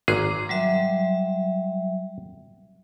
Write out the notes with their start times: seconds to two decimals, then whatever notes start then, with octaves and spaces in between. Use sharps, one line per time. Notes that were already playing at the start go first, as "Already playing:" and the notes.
0.08 G#1 G#4 A#5 C6 D6
0.49 F#3 G3 E5